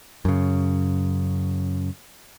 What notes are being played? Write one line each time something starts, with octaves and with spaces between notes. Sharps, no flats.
F#2 C#3